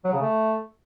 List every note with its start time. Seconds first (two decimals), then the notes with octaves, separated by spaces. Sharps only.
0.05 F#3
0.13 C#3
0.21 A3